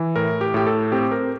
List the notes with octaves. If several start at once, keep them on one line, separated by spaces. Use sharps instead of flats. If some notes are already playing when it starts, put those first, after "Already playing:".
Already playing: E3
A2 A#4
G4
A2 G4
A4
C4 G4
A#4